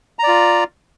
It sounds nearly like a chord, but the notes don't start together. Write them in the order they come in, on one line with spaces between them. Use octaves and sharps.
A#5 D5 F4